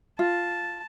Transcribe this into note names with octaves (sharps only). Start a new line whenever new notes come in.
F4 A5